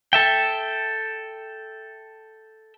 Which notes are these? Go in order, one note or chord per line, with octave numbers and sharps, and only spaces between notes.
A4 E5 G5